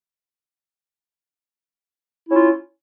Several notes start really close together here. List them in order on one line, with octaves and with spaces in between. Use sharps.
E4 C#4 F4